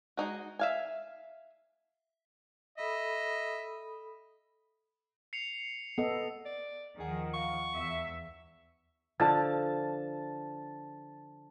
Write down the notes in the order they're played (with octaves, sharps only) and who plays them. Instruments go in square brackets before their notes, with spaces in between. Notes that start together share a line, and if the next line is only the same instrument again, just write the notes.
[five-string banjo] G#3 D#4 F#4
E5 F5 G#5
[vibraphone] A4 B5 D#6 [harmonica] D#5 E5
[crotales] C7 C#7 F7
[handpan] B3 A4 D#5
[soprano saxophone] D5
[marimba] D#2 F#5 [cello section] D#3 F3 [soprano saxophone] G#4
[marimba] F5 F#5 [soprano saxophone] C#6
[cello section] E2 E5
[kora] D3 F3 [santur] A5